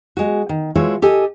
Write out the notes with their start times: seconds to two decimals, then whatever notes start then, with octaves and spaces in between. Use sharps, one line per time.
0.17 G#3 F#4
0.49 D#3
0.75 E3 F3 G#3 F#4 C#5 E5
1.02 G4 A4 D#5 G#5